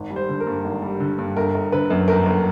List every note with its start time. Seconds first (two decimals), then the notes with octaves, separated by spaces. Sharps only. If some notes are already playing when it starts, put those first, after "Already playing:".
Already playing: G#1
0.10 G3
0.16 C5
0.29 D3
0.40 A#4
0.47 G2
0.64 G#1
0.82 G3
1.00 D3
1.18 G2
1.36 G1 A#4
1.54 G1
1.72 D3 B4
1.90 F#2
2.08 G1 A#4
2.26 G1